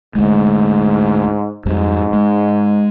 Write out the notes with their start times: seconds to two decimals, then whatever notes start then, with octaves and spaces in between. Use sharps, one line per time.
0.15 D2 G#2 G#3
1.66 F2 G#2 G3
2.13 G#3